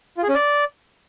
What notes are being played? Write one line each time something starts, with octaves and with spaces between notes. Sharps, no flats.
F4
G#4
C#4
D5